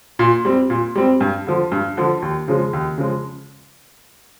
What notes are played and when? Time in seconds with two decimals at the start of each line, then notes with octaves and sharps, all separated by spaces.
0.19 A#2
0.45 G3 C4
0.70 A#2
0.96 G3 C4
1.21 G2
1.47 D3 F3
1.72 G2
1.97 D3 F3
2.22 D#2
2.48 C#3 F3 G#3
2.73 D#2
2.98 C#3 F3 G#3